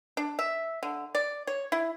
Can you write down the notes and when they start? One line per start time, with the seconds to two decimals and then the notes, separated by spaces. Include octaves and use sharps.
0.17 D4
0.39 E5
0.83 D3
1.15 D5
1.47 C#5
1.72 E4